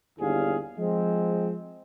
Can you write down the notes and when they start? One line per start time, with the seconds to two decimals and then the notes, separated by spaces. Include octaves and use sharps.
0.20 G1 D#2 D3 E4 G#4 F5
0.78 F3 G#3 C4